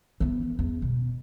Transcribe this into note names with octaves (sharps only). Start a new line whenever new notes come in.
E3 B3
E2
B2